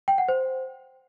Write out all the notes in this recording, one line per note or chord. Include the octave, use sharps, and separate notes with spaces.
G5
F#5
C5